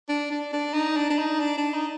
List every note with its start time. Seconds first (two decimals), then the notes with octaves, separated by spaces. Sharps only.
0.09 D4
0.31 D4
0.53 D4
0.74 D#4
0.96 D4
1.10 D4
1.18 D#4
1.40 D4
1.58 D4
1.74 D#4